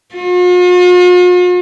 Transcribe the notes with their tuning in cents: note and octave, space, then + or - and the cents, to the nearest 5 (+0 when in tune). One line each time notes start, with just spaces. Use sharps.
F4 +45